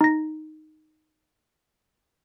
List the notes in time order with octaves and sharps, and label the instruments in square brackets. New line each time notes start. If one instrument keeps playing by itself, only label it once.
[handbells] D#4 A#6